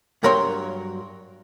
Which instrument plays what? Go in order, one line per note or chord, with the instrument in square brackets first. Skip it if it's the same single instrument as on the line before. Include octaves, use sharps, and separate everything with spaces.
[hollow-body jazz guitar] G2 F#3 A#4 C#5 A#5 C6